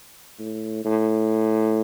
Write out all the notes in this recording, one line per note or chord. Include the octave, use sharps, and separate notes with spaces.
A2
A2